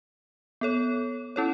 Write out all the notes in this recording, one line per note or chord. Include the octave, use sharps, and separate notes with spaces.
B3 A4 C#5
C#4 E4 A4 C#5